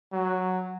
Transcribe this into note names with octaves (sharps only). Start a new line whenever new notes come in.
F#3